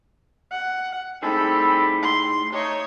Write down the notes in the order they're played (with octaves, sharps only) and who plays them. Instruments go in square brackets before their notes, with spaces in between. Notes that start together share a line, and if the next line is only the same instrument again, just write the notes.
[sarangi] F#5
[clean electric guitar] A2 D#4 G#4 [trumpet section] G3 C4 B5 [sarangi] A4
[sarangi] C6
[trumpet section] A3 D#4 [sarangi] C#5